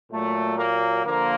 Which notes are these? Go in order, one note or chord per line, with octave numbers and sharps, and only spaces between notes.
A#2 F#3 A3
A#3
D3 F3 A#3